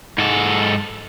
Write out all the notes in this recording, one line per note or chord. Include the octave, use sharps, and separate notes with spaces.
G#2 A4